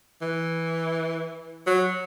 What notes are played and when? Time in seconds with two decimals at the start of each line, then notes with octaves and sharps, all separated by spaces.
0.22 E3
1.67 F#3